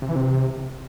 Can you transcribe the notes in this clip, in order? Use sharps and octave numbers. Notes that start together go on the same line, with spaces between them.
C3
E3
C3